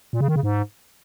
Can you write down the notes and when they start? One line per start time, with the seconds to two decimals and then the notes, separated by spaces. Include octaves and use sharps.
0.13 A#2
0.21 C#3
0.28 D#3
0.36 C#3
0.43 G#2